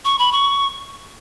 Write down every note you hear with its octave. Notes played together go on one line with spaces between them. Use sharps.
C#6
B5
C#6